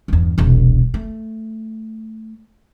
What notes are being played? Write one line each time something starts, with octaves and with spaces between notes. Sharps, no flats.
E2 G2
E1 C2
A3